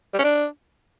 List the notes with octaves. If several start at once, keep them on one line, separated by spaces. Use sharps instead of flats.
G3
C#4
D4